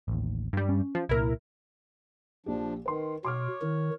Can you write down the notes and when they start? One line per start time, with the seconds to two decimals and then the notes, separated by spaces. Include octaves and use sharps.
0.08 A1 D#2
0.53 G2 G3
0.69 C#4
0.95 F3
1.09 C2 A#2 E4 A#4
2.46 A#1 F3 D4 G4
2.86 D#3 B4 C6
3.25 B2 C#5 C6 D6 F6
3.62 D#3 E4